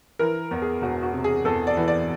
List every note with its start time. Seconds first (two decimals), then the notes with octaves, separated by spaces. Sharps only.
0.19 E3 A#4
0.51 E2
0.62 G#4
0.82 E1 F#4
1.03 F#4
1.13 C3
1.24 G#4
1.45 E2 A4
1.67 D5
1.77 E3
1.88 D5